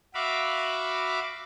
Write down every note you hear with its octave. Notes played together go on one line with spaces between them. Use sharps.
F#4 E5 F5 B5 D6